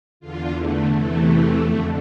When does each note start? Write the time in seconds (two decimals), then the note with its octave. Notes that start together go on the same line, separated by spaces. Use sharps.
0.20 E2 D3 F4
0.56 A3
0.89 E2 C3 E3 A3
1.58 F2 D3